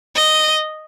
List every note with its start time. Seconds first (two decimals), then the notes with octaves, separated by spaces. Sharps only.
0.16 D#5